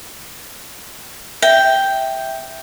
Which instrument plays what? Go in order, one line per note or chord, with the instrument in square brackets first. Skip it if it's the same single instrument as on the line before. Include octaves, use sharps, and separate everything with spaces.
[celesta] E5 [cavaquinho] G5